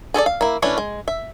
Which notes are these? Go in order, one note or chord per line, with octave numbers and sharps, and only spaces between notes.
G#4 A4 C#5 D5
F5
A#3 E4
E3 A3 C#4 D4 E4
G#3
E5